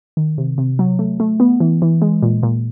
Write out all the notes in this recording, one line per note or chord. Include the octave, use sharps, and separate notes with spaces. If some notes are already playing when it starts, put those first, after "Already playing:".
D#3
C3
C3
F#3
A3
A3
B3
E3
E3
G#3
A#2
A#2